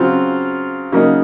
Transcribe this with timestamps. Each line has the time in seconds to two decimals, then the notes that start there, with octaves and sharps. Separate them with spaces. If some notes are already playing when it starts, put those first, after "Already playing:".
Already playing: C#3 F#3 C4 F4
0.92 C#3 F#3 A#3 D#4